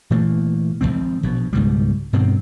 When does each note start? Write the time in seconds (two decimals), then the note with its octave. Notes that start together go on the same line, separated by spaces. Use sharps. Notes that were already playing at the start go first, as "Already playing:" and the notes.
0.11 A#2 E3 A3 A#3
0.81 G#1 D#2 F3 C4
1.23 A#1 B2
1.53 C#2 G#2 B2 G3
2.13 G2 B2 D#3 C4